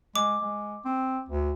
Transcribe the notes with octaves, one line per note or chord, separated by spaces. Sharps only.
G#3 D6
G#3
C4
D2